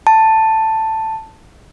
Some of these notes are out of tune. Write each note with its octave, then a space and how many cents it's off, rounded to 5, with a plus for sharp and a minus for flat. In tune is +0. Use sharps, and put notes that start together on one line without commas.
A5 +5